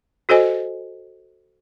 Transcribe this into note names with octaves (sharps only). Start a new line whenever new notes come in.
F#4 A4 C5 D#5 G#5